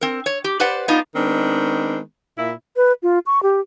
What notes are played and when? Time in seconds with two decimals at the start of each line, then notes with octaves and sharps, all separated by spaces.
0.01 C4 A#4
0.26 C#5
0.44 G4
0.60 G4 B4 C5 D5 F#5
0.88 B3 D4 D#4 F4
1.15 D#3 G#3 B3 C4 D4
2.38 A#2 E4
2.76 B4
3.03 F4
3.26 C#6
3.43 G4